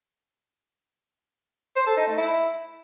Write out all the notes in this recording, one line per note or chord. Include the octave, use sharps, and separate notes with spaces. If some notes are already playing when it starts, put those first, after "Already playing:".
C5
A4
D#4
A3
E4